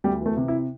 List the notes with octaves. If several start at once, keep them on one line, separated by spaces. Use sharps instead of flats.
D2 G3
E3
A3
C3
E4